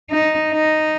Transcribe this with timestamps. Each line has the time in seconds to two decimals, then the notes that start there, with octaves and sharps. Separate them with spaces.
0.11 D#4
0.53 D#4